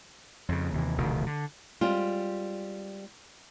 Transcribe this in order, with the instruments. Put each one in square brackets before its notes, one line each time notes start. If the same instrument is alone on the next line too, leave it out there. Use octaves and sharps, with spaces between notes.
[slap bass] F2 C#3
D#2 C3 E3
F1 D2 B2 D#3
D3
[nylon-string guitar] G3 G#3 C4 F4